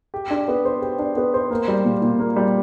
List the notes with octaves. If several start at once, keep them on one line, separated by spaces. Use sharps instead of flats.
G4
D4
B3
C5
G4
D4
B3
C5
A#3
G3
A#2
A#2
A#3
G3